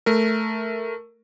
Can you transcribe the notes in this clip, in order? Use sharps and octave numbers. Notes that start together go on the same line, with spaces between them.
A3 A#4